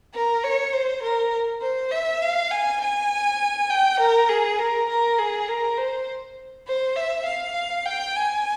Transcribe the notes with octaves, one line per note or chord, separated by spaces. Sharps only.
A#4
C#5
C5
A#4
C5
E5
F5
G#5
G#5
G5
A#4
G#4
A#4
A#4
G#4
A#4
C5
C5
E5
F5
G5
G#5